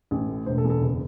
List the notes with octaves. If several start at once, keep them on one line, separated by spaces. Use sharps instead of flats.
A1
A2
E1 C5
A4
E2
A4
F#1